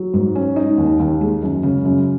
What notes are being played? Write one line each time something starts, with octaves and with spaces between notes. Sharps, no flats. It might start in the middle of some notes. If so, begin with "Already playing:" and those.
Already playing: F#3
G#2
C#4
D#4
D#2
D#2
G#3
F#2
C#3
F#2